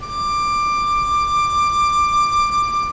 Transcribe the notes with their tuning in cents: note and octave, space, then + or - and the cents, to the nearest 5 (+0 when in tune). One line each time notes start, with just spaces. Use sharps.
D6 +15